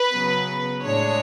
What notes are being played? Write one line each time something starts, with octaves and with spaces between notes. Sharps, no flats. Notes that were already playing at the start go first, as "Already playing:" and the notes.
Already playing: B4
C#3 F#3 B3
A2 G#3 D4 C#5